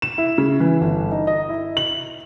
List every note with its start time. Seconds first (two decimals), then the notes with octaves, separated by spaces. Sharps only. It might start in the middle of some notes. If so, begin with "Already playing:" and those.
0.02 E7
0.18 E4
0.38 C#3
0.60 E3
0.81 G1
1.12 D#4
1.27 D#5
1.49 E4
1.77 F#7